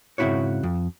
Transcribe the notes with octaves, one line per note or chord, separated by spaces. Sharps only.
G#2 C#3 C4 E4 F#4 C#5
F2